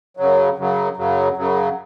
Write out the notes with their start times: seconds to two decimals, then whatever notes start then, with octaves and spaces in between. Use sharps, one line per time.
0.17 F#2 C#3 F#3
0.58 F#2 C#3 F#3
0.97 F#2 C#3 F#3
1.37 F#2 C#3 F#3